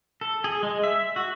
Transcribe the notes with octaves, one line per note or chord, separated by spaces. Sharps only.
A4
G#4
G#3
E5
F#4